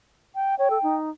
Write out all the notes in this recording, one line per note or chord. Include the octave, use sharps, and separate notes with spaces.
G5
C#5 G5
A4
D#4